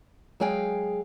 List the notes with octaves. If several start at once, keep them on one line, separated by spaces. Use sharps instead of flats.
F#3 G#3 G#4 F5 G5